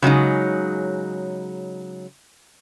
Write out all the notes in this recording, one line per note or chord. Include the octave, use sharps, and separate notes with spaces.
C#3 F#3 G#3 D#4